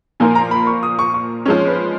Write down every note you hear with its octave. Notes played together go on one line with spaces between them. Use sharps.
A#2 F3 A#3 F4 A#4 G#5
A#5
B5
C#6
D#6
C#6
C#6
F3 G#3 C#4 C#5
B4